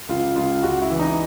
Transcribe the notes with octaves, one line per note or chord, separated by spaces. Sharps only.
C#2 F4
C#2 F4
C#2 F#4
E4
E3
D#4